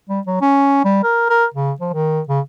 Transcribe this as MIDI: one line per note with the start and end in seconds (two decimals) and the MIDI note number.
0.09 0.20 55
0.27 0.36 54
0.41 0.82 61
0.85 1.02 55
1.03 1.28 70
1.29 1.45 70
1.54 1.72 49
1.80 1.92 53
1.93 2.21 51
2.29 2.40 49